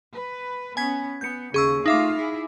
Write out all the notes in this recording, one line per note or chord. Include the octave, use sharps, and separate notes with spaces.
B4
B3 C#4 G#5 G#6 B6
B3 G6 C#7
D#2 C#3 G#4 C#6 E6
A3 D#4 F4 E5 F5 D6
E4 G#4